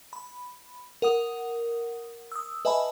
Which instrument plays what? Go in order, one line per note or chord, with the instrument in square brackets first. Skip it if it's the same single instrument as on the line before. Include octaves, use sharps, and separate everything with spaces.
[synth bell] B5
A#4 F#5 D#6
D#6 E6
B4 D#5 E5 G#5 A5 B5